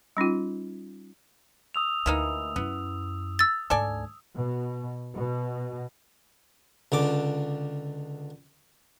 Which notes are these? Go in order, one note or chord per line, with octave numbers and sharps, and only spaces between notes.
G3 C#4 D#4 F4
D#6 E6 F7
D2 E3 A#3 D#4
F#2 B3 E4
E6 A6
D2 G#2 A4 D5 G#5
B2
B2
C#2 D3 D6